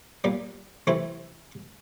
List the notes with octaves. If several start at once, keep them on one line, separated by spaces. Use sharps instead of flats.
A#2 G3 A#3
C3 E3 A3 C4 E4